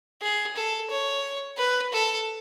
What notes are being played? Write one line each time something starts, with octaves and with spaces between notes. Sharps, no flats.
G#4
A4
C#5
B4
A4